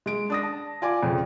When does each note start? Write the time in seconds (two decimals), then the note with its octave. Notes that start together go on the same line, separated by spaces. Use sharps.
0.06 G#3 D7
0.30 D4 D#6 A#6
0.43 A5
0.82 F4 D5 G#5 D6
1.03 F2 C#3